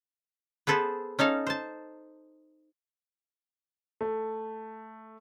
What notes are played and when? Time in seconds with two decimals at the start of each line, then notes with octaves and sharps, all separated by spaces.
0.67 B3 G#4 A4 B4 C5
1.19 C#4 D#4 A4 F5
1.47 C5 A5
4.01 A3